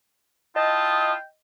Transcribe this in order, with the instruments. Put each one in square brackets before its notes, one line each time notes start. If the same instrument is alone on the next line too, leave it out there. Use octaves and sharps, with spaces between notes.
[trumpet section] E4 F4 A5 [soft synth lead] D#5 [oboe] G5 [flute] D#6